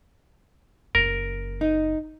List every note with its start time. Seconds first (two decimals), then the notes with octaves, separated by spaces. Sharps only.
0.95 F#1 A#4
1.61 D#4